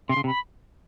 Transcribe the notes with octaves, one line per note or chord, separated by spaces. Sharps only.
C3 C6
C#3
C3
B5